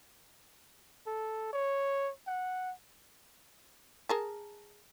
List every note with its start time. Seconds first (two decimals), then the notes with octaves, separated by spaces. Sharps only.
1.07 A4
1.53 C#5
2.27 F#5
4.09 G#4 A#4 A5